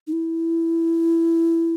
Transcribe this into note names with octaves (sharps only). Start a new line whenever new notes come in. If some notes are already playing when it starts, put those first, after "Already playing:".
D#4
E4